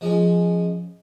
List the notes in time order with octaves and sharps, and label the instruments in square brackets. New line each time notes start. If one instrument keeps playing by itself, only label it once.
[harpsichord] F3 G#3 C#4